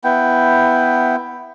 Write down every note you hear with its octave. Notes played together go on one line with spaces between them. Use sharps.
B3 E4 G5